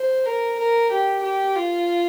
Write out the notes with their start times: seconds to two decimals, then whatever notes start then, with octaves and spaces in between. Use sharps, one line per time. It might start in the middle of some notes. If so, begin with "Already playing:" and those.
Already playing: C5
0.26 A#4
0.59 A#4
0.91 G4
1.23 G4
1.56 F4